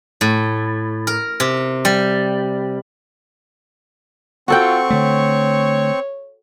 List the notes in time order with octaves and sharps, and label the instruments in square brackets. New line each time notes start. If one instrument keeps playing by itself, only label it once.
[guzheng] A2
A#4
C3
G3
[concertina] C4 C#6 [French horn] F4 [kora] F#4 A4 G5
[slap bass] D3 A3 [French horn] C#5